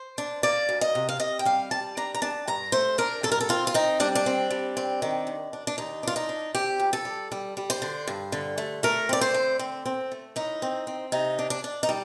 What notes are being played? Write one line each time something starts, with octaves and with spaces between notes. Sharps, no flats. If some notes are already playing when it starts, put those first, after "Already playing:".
Already playing: C5
D4
A#3 D5
D2
D#5
C3
F5
C3 D#5
G5
G3 F5
G3 A5
D4 A#5
A#5
D4 A5
G2 A#5
A3 C5
D4 A#4
G2 A4
A#4
A4
C4 F4
F4
C4 D#4
G3 D4
D4
C4
G3
C4
D#3
D#2
D4
D4
D#2 D#4
D4 F4
D#4
D4
C4 G4
F2
A4
G3
G3
G3
C5
D3
G2
D3
A3
A3 A#4
C4 D5
C5
D3
C4
C4
A3
A2 D#4
C4
C4
C3 D#4
D4
D4
D4
D#4
G3